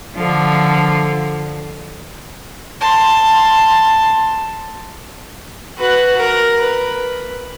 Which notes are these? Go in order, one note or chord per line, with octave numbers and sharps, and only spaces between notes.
D3 F3
A5 C6
F#4 B4
A#4
B4